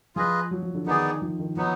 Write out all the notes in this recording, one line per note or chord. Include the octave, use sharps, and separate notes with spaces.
F3 F4 G#4 B4 D#5
F#3
F3
D3
D#3 B3 D#4 G#4 D5
F3
D#3
F3 F#3 B3 D#4